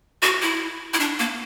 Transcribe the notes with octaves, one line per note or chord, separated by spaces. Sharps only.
F#4
E4
E4
D4
A#3